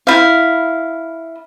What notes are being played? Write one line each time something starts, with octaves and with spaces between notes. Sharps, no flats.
E4 F5